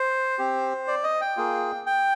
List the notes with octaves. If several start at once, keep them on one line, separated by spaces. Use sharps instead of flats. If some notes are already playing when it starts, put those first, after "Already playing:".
Already playing: C5
C4 G4
D5
D#5
G5
A#3 F4 G#4
G5